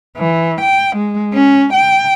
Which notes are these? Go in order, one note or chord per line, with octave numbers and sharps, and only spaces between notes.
E3
G5
G#3
C#4
G5